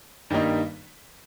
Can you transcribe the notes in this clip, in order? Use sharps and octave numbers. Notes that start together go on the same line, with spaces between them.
G2 D#3 G3 A#3 D#4